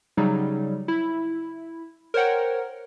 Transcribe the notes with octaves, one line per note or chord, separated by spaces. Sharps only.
C#3 F#3 G3 D#4
E4
A#4 C5 C#5 F#5 G5